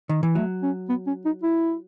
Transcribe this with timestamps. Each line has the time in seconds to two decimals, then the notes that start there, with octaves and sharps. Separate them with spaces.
0.09 D#3
0.23 E3
0.35 F#3 A3
0.62 C#4
0.89 B3
1.07 C#4
1.25 D#4
1.43 E4